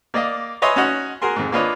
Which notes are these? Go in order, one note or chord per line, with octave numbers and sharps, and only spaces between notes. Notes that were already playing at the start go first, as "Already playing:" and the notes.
A#3 D5 D#5 F5
B4 C#5 D#5 E5 G#5 C6
C#4 D#4 F#4 C#5 D#5 F#5
F#4 G#4 A#4 G#5 C6
F2 G#2
A#3 D4 F4 B4 C#5 D#5